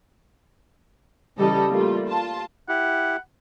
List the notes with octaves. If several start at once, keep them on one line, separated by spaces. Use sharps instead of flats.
C#3 E3 G3 G4 A4 D#5
G3 A3 A#3 F4
F4 A5
E4 G4 F#5